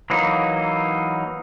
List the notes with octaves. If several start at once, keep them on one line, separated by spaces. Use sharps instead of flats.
E3 F#3 A#3 D#4